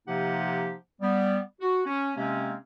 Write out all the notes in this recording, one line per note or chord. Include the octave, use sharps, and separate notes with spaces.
C3 F3 A#3 D#4 G4 F#5
G3 B3
F#4
C#4
C3 G#3 A#3 C4 C#4